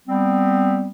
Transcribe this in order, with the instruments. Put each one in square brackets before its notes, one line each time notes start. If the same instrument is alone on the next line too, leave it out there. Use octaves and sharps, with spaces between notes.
[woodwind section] G3 B3 C4